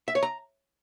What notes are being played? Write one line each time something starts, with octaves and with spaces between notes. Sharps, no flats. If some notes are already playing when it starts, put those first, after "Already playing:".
E5
C#5
A#5